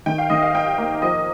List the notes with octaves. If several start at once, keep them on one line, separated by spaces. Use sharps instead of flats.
D#3 G5
F5
D#3 D#5
F5
D#4 G5
A#3
F3 D#5